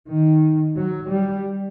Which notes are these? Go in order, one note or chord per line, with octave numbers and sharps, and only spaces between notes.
D#3
F#3
G3